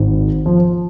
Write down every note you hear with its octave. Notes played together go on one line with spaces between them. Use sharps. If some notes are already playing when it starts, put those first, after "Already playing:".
Already playing: G#1 G#2 D#3
F3